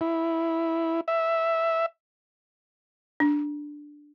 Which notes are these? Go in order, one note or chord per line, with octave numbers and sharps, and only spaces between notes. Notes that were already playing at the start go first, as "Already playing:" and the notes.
E4
E5
D4